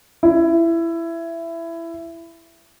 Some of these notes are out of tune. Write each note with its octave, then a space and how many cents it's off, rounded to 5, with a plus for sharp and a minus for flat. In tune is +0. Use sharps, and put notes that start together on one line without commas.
E4 +15